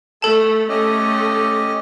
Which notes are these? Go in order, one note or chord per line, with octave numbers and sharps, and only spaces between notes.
A3 A4 A5
A3 C#4 G4 D#5